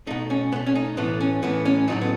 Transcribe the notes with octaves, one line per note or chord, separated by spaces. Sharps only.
B2 A3 D#4
C#4
B2 A3 B3
C#4
D#4
A2 E3 A3 B3
C#4
A2 E3 A3 B3
C#4
A2 F#3 A3 D#4
B3